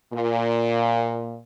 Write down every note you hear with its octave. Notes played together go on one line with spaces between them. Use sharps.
A#2